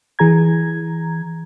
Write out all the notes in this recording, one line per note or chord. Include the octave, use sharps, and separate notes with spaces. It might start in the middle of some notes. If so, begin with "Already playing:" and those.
E3 G#4 A#5 G#6